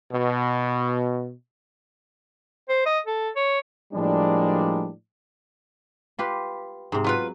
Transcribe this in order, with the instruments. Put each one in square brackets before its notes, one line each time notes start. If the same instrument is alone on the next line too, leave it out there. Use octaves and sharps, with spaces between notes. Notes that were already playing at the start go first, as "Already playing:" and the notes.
[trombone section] B2
[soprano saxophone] C5
D#5
A4
C#5
[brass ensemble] A2 F3 G3 G#3 A#3 D4
[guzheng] F4 G4 B4
G#2 C3
[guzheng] F#3 [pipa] B3 F4 B4